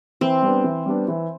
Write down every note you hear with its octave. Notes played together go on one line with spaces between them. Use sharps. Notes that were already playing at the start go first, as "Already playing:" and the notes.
E3 C4
G3 B3 D4
E3
G3 B3 D4
E3